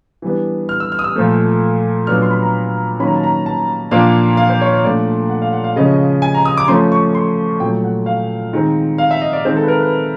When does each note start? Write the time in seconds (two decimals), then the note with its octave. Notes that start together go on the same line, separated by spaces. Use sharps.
0.22 E3 G3 B3 D4
0.69 F6
0.80 E6
0.92 F6
0.99 D#6
1.04 E6
1.16 A#2 F3 A3
2.07 A#2 F#3 B3 D4 F6
2.22 C6
2.31 B5
2.42 A#5
3.00 D#3 F#3 A#3 C#4 B5
3.07 A#5
3.16 A5
3.23 A#5
3.46 A5
3.91 A#2 F3 A#3 D4 F5
4.37 F5
4.49 C5
4.61 C#5
4.72 C#5
4.84 A#2 F3 A3 D4 D5
5.30 F#5
5.42 F5
5.53 F#5
5.64 F5
5.76 C#3 F3 G#3 C#4 D#5
6.22 G#5
6.34 A#5
6.45 D#6
6.57 D6
6.68 F3 A3 C#4 C6
6.92 C#6
7.15 C6
7.60 A#2 F#3 A3 G5
7.84 F#5
8.06 F5
8.53 D#3 G#3 C4
8.98 F5
9.11 E5
9.21 D#5
9.33 D5
9.45 D#3 G#3 C4 C5
9.56 A4
9.63 B4
9.68 A#4
9.80 B4